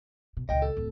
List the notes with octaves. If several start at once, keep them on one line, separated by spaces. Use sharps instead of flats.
B2
C#2 A#2 D#5 G5
A4
D1 D#2